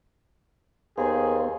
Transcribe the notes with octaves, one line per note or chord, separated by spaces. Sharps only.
D#2 B3 G#4 C5 F5 G#5